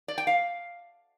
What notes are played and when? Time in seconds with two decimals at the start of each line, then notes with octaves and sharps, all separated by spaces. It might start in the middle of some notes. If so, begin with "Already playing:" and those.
0.08 D5
0.18 G5
0.27 F5